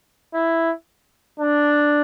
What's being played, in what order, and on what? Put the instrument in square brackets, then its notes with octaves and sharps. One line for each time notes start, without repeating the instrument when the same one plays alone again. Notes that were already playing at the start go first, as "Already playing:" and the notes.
[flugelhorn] E4
D4